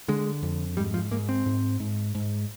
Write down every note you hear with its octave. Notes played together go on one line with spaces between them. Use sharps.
D3 G#3
F2
G#2 G3
F3
G#2 A#3
C4
G#2
G#2
G#2